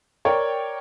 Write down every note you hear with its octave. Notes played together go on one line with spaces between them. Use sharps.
A#4 C#5 D5 G5